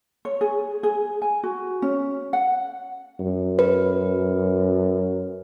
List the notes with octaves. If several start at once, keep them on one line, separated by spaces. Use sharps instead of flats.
C#5
G#4
G#4
G#5
F#4
C#4
F#5
F#2
B4